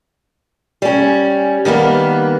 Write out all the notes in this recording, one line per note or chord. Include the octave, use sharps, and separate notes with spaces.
G3 C#4
D#3 G3 A#3 B3